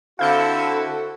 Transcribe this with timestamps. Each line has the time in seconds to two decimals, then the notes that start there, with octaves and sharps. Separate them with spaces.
0.19 D3 C4 E4 F#4 A4 F5 G6 C#7